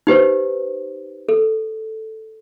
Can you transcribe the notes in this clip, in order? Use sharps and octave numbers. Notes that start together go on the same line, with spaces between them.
D#4 G4 B4 C5
A4